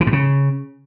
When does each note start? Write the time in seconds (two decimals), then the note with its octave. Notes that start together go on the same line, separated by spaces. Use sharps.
0.01 E3
0.07 G2
0.13 C#3